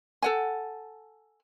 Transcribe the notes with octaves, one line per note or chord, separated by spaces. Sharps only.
A4 F#5 G#5